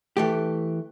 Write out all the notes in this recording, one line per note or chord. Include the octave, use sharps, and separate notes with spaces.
E3 A3 G4